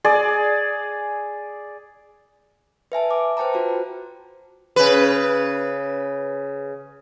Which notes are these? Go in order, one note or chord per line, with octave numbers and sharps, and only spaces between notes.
G#4 D5
B4 E5 G#5 A5
D6
B4 C5 G5 A5 A#5
F4 F#4 C5
C#3 B4